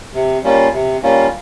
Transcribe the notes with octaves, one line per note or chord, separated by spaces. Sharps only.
C3
G3 A#3 C#4 F4
C3
G3 A#3 C#4 F4